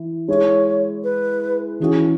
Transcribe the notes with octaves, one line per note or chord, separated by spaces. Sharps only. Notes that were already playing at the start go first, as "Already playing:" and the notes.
Already playing: E3 E4
G#3 E4 G#4 C#5
B4
E3 C#4 F#4 G#4